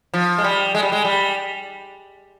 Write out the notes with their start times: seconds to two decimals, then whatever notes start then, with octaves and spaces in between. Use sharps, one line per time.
0.14 F3
0.38 G#3
0.44 G3
0.75 G#3
0.83 G3
0.92 G#3
1.05 G3